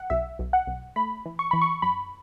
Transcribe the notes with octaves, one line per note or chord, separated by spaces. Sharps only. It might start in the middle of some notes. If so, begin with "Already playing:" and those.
Already playing: F#5
B1 E5
B1
F#5
B1
A3 B5
E3
C#6
E3 B5
C#6
F#2 B5